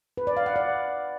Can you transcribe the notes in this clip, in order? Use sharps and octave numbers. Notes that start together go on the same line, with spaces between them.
B4
D5
F5
F#5
D5